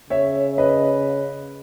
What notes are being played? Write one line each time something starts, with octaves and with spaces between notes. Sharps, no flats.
C#3 C#5 E5
B4 D#5